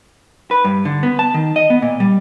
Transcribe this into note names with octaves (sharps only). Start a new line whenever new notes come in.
B4
G2
D3
B3
A5
D#3
D#5
B3
A#2
G3